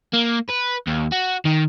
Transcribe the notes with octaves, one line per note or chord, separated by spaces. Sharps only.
A#3
B4
D#2
F#4
D#3